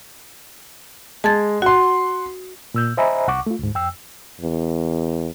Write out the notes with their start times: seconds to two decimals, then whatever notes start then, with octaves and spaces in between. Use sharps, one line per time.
1.24 G#3 A5 G#6 A6
1.62 F#4 F#5 C6
2.74 A#2 E6 G6
2.97 C5 D#5 E5 G#5 A#5 B5
3.28 C2 F#5 C#6 D6
3.46 A3 F4
3.59 D2 G#2
3.75 F2 G5 E6
4.41 E2